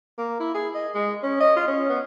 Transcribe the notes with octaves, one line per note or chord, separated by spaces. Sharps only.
A#3
E4
G#4
D#5
G#3
C#4
D#5
F4
C#4
B3